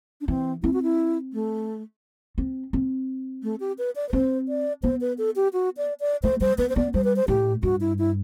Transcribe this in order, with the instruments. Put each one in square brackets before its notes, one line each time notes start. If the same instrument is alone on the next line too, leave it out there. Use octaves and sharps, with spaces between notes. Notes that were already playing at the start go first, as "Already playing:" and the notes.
[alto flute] D4
[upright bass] E3 [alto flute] C4
[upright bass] C4 [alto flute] E4
[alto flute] F#4
E4
A3
[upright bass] C4
C4
[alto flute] A3
G4
B4
D5
B4
[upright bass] C4 [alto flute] C5
[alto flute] D5
[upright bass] B3 [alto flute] C5
[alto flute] B4
A4
G4
F#4
D5
D5
[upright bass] A3 [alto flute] C5
[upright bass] G3 [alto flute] C5
[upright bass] B3 [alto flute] B4
[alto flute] C5
[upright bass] B3 [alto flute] D5
[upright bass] G3 [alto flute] C5
[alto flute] B4
C5
[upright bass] A2 [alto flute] G4
[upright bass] G2 [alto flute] F#4
[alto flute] E4
E4